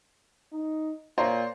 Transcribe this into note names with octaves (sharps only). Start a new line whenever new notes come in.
D#4
A#2 C5 C#5 A#5